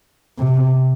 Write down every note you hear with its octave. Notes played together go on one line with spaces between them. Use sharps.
C3